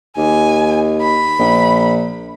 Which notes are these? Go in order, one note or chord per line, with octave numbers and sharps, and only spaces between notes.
D#2 G#5
B5
A#1